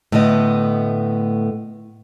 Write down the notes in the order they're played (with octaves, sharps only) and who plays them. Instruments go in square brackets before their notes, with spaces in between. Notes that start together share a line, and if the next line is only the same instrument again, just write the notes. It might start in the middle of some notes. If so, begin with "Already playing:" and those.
[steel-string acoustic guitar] A2 D3 A3 B3 D#5